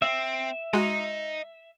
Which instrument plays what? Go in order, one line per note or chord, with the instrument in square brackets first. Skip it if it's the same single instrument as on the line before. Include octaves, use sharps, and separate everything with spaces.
[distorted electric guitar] C4 [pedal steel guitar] E5
[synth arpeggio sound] G#3 F#4 [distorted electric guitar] D#5 A#5